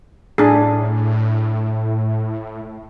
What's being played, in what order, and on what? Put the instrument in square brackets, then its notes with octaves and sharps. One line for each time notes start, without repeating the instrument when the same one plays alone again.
[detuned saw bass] A2 [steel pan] D4 G#4